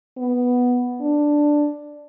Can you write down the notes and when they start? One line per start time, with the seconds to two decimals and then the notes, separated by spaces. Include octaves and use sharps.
0.17 B3
1.01 D4